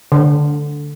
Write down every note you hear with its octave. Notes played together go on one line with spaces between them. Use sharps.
D3